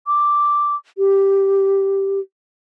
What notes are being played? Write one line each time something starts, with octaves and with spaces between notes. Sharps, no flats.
D6
G4